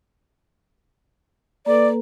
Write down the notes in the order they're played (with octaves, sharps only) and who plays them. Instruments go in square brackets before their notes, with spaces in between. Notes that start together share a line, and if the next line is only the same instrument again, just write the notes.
[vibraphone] A#3 A4 B4 [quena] D5